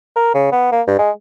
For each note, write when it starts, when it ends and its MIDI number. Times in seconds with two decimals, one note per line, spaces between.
0.16 0.32 70
0.35 0.50 49
0.52 0.71 59
0.72 0.82 58
0.87 0.99 43
0.99 1.11 56